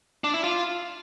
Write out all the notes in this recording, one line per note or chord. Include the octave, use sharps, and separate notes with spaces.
D4
E4
F4